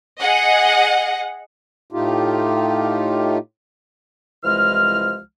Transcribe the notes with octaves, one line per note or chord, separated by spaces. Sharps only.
G#4 D#5 F#5
A2 A3 D#4 F4 G4
C2 E3 F3 G#3 F6